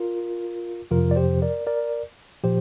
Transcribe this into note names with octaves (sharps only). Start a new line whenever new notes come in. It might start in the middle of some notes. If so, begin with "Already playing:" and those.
Already playing: F4 A#4
F2 C3 F3 F4 A#4
D5
G4 C5
A#4 D5
A#4 D5
A#2 F3 G4 C5